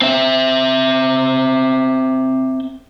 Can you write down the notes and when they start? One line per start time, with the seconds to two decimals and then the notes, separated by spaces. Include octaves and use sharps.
0.02 C4 E5